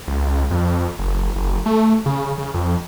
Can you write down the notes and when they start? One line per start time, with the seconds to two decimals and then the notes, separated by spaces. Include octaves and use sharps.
0.08 C#2
0.51 F2
0.99 F#1
1.36 F#1
1.66 A3
2.06 C#3
2.38 C#3
2.54 F2